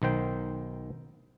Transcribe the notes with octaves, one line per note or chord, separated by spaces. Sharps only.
B1 D#3 C5 G5